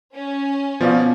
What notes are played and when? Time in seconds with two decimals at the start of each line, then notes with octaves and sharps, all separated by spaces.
0.15 C#4
0.81 B2 F3 B3 D5 F5